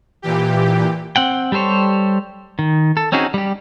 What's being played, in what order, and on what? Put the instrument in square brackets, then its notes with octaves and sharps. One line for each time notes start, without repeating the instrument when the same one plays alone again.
[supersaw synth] A#2 E3 G4
[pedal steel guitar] C4 F#5 G5
G3 G4 A4 C5 C#5
D#3
A4
C4 C#4 D#4 F#4 G#4
G3 G4